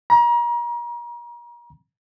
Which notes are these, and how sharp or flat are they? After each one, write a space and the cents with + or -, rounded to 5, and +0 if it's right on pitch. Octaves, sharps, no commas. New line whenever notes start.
A#5 +35